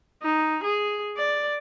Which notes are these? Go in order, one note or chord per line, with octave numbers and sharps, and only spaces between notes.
D#4
G#4
D5